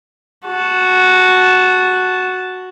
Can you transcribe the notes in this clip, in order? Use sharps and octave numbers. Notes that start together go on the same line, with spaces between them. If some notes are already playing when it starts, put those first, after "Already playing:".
F#4 A5